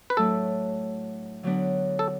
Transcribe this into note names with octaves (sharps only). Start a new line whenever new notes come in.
B4
A2 F#3 A3 D4 A4
D3 F#3 B3 D4
A4